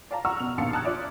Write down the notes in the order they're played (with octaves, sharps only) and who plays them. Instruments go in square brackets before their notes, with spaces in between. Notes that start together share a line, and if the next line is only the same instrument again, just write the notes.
[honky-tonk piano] D5 F5 A5 A#5
F#5 A#5 C#6 E6 F6
B2 F7
A#1 D#2 B2 F5 A5 C#7
A5 A#5 D#6 F6 F#6 G#6
D4 F4 D5 E5